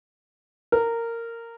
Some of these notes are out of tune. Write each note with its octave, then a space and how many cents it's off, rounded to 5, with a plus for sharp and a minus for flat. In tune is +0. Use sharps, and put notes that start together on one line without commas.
A#4 -15